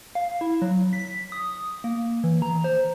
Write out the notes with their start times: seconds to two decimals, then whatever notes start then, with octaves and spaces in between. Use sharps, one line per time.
0.15 F5
0.41 E4
0.62 F#3
0.93 B6
1.32 D#6
1.84 A#3
2.24 E3
2.42 A#5
2.64 C5